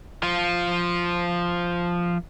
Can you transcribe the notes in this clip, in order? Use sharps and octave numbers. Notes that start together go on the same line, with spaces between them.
F3 F4